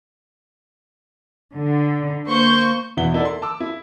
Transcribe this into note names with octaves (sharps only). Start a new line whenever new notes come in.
D3
A#3 C5 C#6 G6
E2 B2 E3 E5 F#5 G7
D#4 E4 A4 A#4 D5 F#5
C6
A5 D6 E6
E4